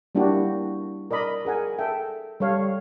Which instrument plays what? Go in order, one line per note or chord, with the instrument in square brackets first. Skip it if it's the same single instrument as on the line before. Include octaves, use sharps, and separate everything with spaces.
[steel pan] G3 A#3 D4 E4 F#4 G4
A#4 D5 D#5 B5
G#4 A#4 F#5 G#5
A4 E5 G5
G3 A4 C#5 F5